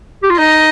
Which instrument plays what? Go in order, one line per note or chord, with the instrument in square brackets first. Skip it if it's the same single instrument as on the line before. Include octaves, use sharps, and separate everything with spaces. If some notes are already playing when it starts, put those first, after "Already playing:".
[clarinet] G4
F4
[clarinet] D#4 [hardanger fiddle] D#5